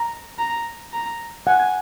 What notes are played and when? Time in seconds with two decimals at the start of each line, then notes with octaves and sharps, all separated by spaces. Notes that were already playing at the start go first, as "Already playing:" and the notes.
Already playing: A#5
0.38 A#5
0.93 A#5
1.47 F#5 G#5